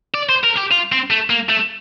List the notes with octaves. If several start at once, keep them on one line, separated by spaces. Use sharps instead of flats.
D5
C5
A#4
G4
F4
C4
A3
A#3
A3